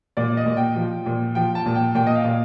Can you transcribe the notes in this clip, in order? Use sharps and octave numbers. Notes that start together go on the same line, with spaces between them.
A#2 D5
D#5
A#2
G5
F3
A#2
F3 G5
A5
A#2
G5
A#2 G5
D#5
F5
A#2